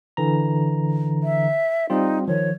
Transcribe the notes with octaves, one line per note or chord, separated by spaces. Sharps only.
D3 E3 A#5
E5
G3 C4 D#4 F4
D#3 F3 C#5